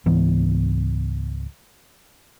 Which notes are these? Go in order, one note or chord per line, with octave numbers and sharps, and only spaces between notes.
C#2 G#2 E3 B3